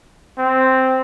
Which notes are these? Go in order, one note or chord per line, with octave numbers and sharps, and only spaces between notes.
C4